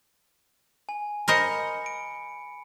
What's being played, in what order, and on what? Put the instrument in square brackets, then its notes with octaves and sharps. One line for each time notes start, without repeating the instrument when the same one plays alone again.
[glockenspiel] G#5
[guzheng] A#4 C5 D#5 [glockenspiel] B5 C#7
[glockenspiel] D7